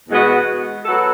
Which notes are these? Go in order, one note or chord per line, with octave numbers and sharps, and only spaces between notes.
E2 B2 G#3 B3 F#4
F#3 B3 F#4 A4